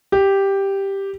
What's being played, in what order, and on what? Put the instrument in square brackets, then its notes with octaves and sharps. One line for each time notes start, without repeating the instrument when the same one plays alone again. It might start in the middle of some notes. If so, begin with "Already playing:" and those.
[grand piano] G4